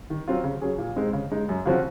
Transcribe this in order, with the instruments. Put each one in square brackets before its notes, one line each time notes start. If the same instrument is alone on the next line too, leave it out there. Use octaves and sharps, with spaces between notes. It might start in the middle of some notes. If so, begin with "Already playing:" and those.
[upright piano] D#3
F#3 C4 F4
C#3
F#3 C#4 G#4
A#2
G#3 C4 D#4
C#3
G#3 D#4
F#2
C#3 F3 C4 F#4